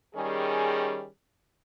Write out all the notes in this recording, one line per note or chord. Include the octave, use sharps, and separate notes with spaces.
D#3 G3 C#4 G#4